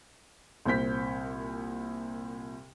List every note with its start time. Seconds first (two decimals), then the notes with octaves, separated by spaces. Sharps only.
0.66 C2 A#2 C5 G6 B6